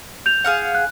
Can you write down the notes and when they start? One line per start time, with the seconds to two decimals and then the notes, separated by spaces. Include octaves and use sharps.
0.26 G6 F7
0.44 G#4 F5 F#5
0.75 F#6